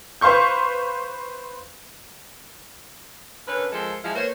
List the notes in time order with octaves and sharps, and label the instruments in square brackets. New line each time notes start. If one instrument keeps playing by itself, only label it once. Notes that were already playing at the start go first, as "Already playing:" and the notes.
[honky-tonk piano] B4 C5 F5 C6 C#6 G6
[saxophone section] D3 C#4 A#4 B4
F3 G#3 A4 A#4 C5
F3 G#3 E4 F5
A#3 B3 C5 C#5